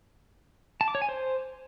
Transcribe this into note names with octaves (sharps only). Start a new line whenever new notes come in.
A5
D6
C#5
G#5
C5